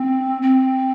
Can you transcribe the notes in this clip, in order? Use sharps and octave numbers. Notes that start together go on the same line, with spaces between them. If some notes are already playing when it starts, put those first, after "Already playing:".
Already playing: C4
C4